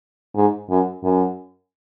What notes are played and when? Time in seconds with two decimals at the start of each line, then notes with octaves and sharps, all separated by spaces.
0.35 G#2
0.69 F#2
1.03 F#2